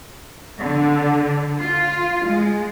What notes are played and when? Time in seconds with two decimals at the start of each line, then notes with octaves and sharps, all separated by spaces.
0.61 D3
1.59 F4
2.26 G#3